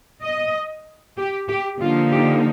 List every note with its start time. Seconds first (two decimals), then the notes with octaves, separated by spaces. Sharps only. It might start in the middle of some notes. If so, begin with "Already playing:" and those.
0.23 D#5
1.17 G4
1.48 G4
1.80 D3 F3 A#3 D#4 F4
2.11 G4